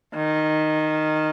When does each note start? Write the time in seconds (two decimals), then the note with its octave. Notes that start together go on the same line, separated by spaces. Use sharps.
0.15 D#3